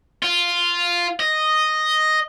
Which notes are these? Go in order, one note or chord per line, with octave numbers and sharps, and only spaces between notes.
F4
D#5